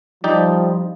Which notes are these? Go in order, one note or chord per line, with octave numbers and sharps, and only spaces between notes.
F3 G3 D#4 G4 D5